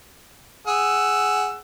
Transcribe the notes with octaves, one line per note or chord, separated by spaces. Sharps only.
G#4 F#5 E6